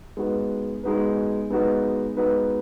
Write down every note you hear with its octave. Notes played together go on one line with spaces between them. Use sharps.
G#3 B3 D#4 F#4 B4
G#3 B3 D#4 F#4 B4
G#3 B3 D#4 F#4 B4
G#3 B3 D#4 F#4 B4